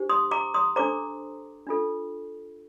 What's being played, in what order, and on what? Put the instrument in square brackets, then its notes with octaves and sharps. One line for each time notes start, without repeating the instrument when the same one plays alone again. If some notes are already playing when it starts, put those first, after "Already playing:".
Already playing: [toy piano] D4 G4 C5
C6 D#6
A#5 D6
C6 D#6
D4 A4 C5 A#5 D6
D4 F4 A4